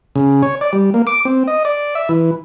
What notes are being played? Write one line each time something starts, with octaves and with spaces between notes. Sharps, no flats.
C#3
C#5
D5
G3
A#3
D6
C4
D#5
D5
E5
E3